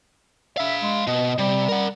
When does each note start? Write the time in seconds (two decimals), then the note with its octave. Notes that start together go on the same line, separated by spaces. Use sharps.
0.57 E5 F5 B5
0.82 G#3
1.07 B2 D#5
1.38 C3 G3
1.69 A#4 F#5